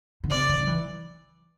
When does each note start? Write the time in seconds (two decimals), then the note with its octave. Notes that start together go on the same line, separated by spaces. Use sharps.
0.24 D3
0.31 C3 D5
0.49 D3
0.60 F#3
0.67 E3